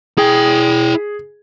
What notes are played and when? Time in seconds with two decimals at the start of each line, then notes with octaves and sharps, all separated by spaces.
0.18 E4 G#4 G5